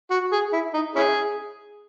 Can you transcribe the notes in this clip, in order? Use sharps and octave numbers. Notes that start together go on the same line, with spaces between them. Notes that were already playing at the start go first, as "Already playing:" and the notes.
F#4
G#4
E4
D#4
C#4 E4 G#4